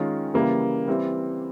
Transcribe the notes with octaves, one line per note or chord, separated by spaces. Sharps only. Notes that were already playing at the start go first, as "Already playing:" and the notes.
Already playing: D#3 G#3 C#4 F4
C#3 E3 G3 A#3
E3 G3 C4